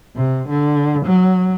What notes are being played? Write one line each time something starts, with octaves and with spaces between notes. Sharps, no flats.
C3
D3
F#3